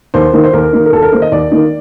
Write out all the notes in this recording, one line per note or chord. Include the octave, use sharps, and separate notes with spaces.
D#2 C5
D#3 A#3 D#4
C5
D#2 A#4
D#3 A#3 D#4
A#4
D#2 A4
A#4
D#3 A#3 D#4 C5
D#5
D#2 D5
D#3 A#3 D#4